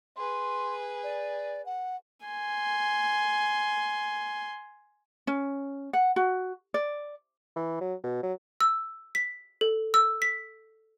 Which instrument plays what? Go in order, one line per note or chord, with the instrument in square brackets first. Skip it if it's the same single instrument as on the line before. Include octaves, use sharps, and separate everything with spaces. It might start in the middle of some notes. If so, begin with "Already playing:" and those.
[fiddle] G#4 B4 [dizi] C6
[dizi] D5
F#5
[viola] G#5 C6
[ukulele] C#4
F#5
F#4
D5
[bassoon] E3
F#3
B2
F#3
[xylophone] E6
B6
A4
E6
B6